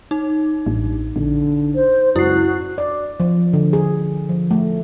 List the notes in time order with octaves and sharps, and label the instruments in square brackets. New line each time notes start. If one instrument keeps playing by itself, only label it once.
[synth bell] D#4
[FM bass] A1 [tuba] G2
[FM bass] A#1 [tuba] D3
[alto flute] C5
[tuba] C#2 [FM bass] F#2 [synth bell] E4 C7 [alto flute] F#4
[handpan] D5
F3
D3
G#4
F3
A3